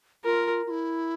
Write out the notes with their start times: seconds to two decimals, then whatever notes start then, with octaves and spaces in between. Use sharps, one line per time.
0.24 F4 A#4
0.67 F4
0.70 E4